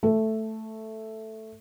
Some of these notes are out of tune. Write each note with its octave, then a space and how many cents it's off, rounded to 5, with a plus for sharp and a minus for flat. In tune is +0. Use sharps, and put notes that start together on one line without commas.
A3 +0 A4 +0